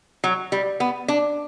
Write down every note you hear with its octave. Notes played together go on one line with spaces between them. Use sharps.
F#3
G3
B3
D4